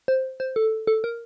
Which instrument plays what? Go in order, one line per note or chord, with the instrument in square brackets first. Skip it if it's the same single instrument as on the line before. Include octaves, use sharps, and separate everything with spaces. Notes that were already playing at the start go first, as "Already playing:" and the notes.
[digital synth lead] C5
C5
A4
A4
A#4